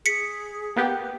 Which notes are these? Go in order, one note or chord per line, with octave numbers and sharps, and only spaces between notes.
G#4 B6 C#7
A#3 B3 G4